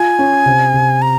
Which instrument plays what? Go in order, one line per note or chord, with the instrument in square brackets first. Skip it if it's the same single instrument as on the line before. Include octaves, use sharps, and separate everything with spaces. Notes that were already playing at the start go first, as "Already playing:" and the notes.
Already playing: [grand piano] F4 [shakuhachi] G#5
[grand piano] C#4
C3
C3
[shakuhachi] A#5